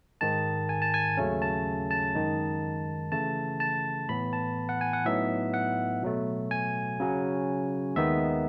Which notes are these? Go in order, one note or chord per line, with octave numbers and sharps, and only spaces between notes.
G#2 D#3 G#3 A5
G#5
A5
G#5
D#2 C#3 F#3 A3 C#4
A5
A5
F#2 D#3 G#3 D#4
C#3 E3 A3 A5
A5
A2 E3 B3 B5
A5
F#5
G#5
F#5
A2 F#3 B3 D#4 E5
F#5
B2 F#3 A3
G#5
C#3 F#3 C#4
D#2 D#3 G#3 B3 D#4 E5